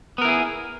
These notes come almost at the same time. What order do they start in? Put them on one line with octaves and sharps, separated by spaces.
B3 A#4 E4 G#4